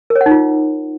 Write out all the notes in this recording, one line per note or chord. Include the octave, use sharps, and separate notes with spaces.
A#4
C#5
F#5
D#4
F4